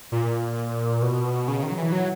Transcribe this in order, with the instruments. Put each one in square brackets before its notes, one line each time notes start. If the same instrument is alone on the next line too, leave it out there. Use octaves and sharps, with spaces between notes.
[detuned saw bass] A#2
B2
C#3
D#3
F#3
E3
F#3